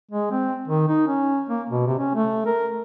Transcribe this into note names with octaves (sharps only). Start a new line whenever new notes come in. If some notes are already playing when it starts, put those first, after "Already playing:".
G#3
C4
D#3
D#4
C#4
A#3
B2
C3
C#4
A3
A#4